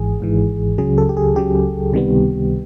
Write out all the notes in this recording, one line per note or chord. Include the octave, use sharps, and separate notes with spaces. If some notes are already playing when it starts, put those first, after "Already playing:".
Already playing: G#1 G#2 E3 G#4
G#1 G#2 E3
C#2 C#3 F#3 G#4
A4
G4
G#4
C#2 C#3 F#3 G4
C#2 C3 D#3 G3 B3